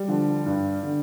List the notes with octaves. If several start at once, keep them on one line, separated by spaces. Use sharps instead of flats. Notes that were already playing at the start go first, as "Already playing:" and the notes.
Already playing: G3
D3 F3
G2
D3